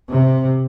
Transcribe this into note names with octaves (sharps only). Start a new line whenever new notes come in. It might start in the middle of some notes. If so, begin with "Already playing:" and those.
C3